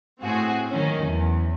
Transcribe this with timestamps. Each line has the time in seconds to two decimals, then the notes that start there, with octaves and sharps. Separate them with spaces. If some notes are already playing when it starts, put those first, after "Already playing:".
0.22 A2 C4 F#4 G#4
0.71 D#3 F#3 C#4
1.04 E2